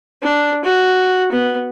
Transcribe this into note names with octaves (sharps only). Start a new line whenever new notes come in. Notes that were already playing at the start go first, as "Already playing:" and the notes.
D4
F#4
B3